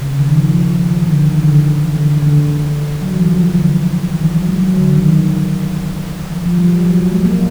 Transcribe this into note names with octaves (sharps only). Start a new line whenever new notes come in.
C#3
D#3
F3
F3
D#3
D3
D#3
D3
D3
E3
D3
D3
F#3
E3
F3
E3
D3
D3
D#3
E3
F#3
G#3
F#3
D3
D#3
F3
F3
G3
F3
F#3
G3
G#3
A#3